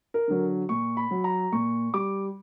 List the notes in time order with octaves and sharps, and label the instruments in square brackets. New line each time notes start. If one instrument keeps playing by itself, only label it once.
[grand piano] A#4
D3 F#3
A#2 C#6
B5
F#3
A#5
A#2 C#6
G3 D6